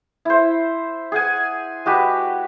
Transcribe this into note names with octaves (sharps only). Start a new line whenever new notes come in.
E4 C5
G#4 F#5 G#5
G#3 F#4 G4 B4